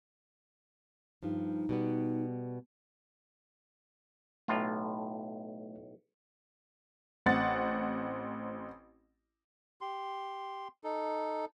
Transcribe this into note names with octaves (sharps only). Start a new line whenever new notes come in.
G2 F3 D#4
B2 G3 B3
B1 A2 A3 F4
A1 C4 F#5 A6
G4 C6
D#4 A4